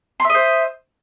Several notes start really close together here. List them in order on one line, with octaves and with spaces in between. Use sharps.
C6 E5 D#5 C5